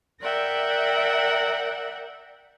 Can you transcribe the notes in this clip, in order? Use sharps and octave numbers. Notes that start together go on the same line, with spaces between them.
A#4 D5 E5 F#5 G5